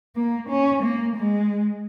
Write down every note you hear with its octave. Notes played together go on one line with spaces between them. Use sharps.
A#3
C#4
A#3
G#3